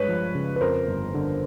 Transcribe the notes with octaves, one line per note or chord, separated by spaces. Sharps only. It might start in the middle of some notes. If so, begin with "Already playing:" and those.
Already playing: G2 G#3 B4 C#5
F3
C#3
B4
F2 A#4 C5
G1
D3